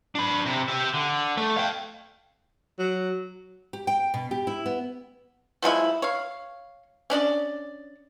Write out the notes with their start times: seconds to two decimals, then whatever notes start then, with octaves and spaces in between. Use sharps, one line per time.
0.15 D4 B5
0.46 C3
0.69 G4 E5
0.94 D3
1.37 A3
1.57 F5 G5
2.79 F#3
3.73 G4
3.87 G5
4.14 B2
4.31 G4
4.47 E4
4.66 B3
5.62 F3 F#3 G#3 E4
6.02 C#5 F5
7.10 C#4 D4 D5 D#5